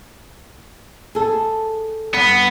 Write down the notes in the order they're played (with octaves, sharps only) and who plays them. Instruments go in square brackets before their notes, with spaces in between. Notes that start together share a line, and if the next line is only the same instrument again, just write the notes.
[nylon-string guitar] G#4 A4
[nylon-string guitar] G2 [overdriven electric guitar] B3